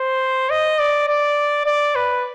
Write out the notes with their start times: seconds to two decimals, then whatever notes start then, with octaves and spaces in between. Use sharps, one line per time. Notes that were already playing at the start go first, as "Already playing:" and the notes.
Already playing: C5
0.50 D#5
0.79 D5
1.08 D5
1.66 D5
1.96 B4